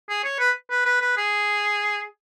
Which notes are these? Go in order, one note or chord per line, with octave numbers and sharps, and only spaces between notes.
G#4
C#5
B4
B4
B4
B4
G#4